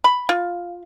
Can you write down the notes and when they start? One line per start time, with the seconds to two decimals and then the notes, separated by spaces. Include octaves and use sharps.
0.04 B5
0.29 F4